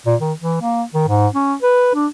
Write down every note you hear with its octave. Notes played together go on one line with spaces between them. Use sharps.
A#2
D#3
E3
A#3
D#3
G#2
C#4
B4
D4